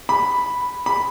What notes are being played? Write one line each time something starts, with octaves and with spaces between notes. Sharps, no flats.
B5
B5